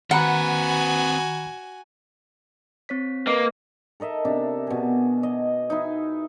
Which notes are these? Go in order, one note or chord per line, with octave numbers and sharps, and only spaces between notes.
D#3 C4 F#4 B4 F#5 G#5 A#5 B5
C4 C#5 B6
A#3 B4 D#5
A4 A#4 D#5 E5
C3 D4
B2 G#4
D#5
D#4 E4